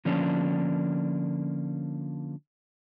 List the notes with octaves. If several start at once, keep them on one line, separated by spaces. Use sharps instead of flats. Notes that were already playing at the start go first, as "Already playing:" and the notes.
D3 F3 A#3 C#4 D4